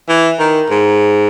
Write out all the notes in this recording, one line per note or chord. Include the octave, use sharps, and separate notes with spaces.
E3
D#3
G#2